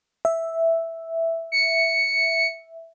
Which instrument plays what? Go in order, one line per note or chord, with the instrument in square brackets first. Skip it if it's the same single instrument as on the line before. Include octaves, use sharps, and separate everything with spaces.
[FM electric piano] E5
[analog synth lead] C#7